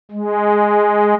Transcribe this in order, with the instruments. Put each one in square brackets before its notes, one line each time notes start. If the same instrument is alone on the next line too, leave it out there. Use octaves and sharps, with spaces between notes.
[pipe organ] G#3